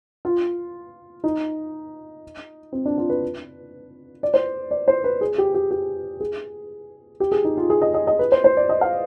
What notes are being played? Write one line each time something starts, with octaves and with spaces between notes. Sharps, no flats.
F4
D#4
C4
D4
F4
B4
D5
C5
D5
C5
B4
G#4
G4
G4
G4
G#4
G4
G#4
D#4
F4
G#4
D#5
D#5
D#5
B4
C5
C5
D5
D#5
F5